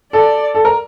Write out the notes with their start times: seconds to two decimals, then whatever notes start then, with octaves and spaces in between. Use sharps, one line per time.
0.13 A4 D5
0.55 A4
0.65 A#4